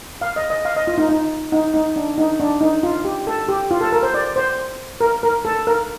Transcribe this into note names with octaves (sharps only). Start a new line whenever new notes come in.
F5
D#5
D#5
F5
D#5
F4
D#4
D#4
D#4
D#4
D4
D#4
D4
D#4
F4
G4
A4
G4
F4
A4
A#4
C5
D5
C5
A#4
A#4
A4
A#4